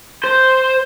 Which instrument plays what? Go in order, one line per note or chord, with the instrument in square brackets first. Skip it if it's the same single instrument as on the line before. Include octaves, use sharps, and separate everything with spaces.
[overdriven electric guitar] C5